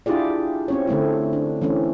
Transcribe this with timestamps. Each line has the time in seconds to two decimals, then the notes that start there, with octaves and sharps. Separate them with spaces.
0.06 D4 E4 F4 G4 G#4 D5
0.68 C4 C#4 C#5
0.87 D3 A3 C4 E4
1.33 D4
1.62 E3 A3 C4 C#4